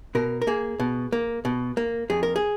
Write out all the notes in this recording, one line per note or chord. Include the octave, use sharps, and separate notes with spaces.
B2 A#4
A#4
A#3 G#4
B2
A#3
B2
A#3
F2 G#4
A#4
G#4